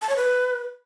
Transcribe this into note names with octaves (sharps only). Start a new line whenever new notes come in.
A5
C#5
B4